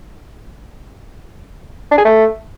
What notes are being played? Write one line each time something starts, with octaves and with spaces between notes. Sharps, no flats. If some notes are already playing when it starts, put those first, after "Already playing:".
D4
G#4
A3